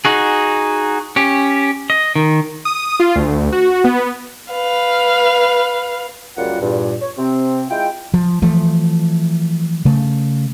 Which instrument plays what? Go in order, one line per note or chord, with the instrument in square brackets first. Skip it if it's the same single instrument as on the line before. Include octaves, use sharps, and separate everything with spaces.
[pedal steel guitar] D#4 F#4 G#4
C#4 G4
D#5
D#3
[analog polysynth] D#6
F4
D2
F#4
B3
[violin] B4 F5
[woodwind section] C#2 F#2 G3 A#3 F4 F#5
E2 G2 A#2
C#5
C3 C4
G#3 E4 F4 G5
[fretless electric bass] F3
E3 F3 A3
C#3 A3